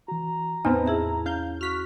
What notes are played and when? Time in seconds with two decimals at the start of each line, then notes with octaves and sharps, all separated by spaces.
0.08 E3 F#4 A#5
0.65 E2 A2 B3 C4 D#4 A5 B5 F6
0.86 E4 G#4 E5
1.26 C#4 F5 G6
1.61 F#4 F6 B6